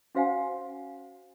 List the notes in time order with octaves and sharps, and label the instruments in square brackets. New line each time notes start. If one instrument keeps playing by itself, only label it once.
[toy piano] C#4 F#4 C5 F5 F#5 G#5